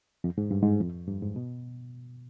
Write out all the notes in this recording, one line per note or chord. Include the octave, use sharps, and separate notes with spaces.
F2
G#2
G2
G#2
F2
G2
G#2
B2